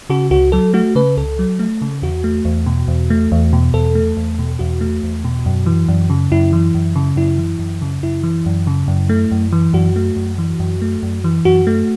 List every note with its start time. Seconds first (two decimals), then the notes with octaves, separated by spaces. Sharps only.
0.10 C#3 F#4
0.31 C#2 F#4
0.52 F#3 A4
0.74 A3 F#4
0.95 C#3 B4
1.17 C#2 A4
1.39 F#3
1.59 A3
1.82 C#3
2.02 E2 F#4
2.24 A3
2.45 E2
2.66 B2
2.88 E2
3.10 A3
3.32 E2
3.53 B2
3.73 E2 A4
3.95 A3
4.17 E2
4.39 B2
4.59 E2 F#4
4.81 A3
5.03 E2
5.24 B2
5.46 F#2
5.66 E3
5.88 F#2
6.10 C#3
6.32 F#2 E4
6.53 E3
6.74 F#2
6.95 C#3
7.16 F#2 E4
7.38 E3
7.59 F#2
7.82 C#3
8.03 F#2 E4
8.23 E3
8.46 F#2
8.67 C#3
8.88 F#2
9.09 A3
9.31 F#2
9.52 E3
9.73 F#2 F#4
9.96 A3
10.16 F#2
10.38 E3
10.59 F#2
10.82 A3
11.03 F#2
11.24 E3
11.45 F#2 F#4
11.67 A3